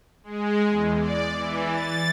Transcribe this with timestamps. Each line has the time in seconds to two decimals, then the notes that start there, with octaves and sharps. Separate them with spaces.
0.23 G#3
0.69 E2
0.99 D5
1.34 E3
1.69 A6